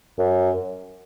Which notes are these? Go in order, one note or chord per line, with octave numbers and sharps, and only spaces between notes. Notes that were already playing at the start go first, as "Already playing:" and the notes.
F#2